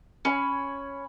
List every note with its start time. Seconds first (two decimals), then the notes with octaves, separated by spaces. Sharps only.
0.25 C#4 G#5 B5